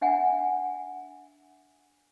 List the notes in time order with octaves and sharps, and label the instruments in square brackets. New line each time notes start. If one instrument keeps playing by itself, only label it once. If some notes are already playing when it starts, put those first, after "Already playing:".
[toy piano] D4 E5 F#5 G#5 A#5